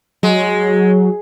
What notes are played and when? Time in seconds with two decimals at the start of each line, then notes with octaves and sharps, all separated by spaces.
0.23 F#3 G#3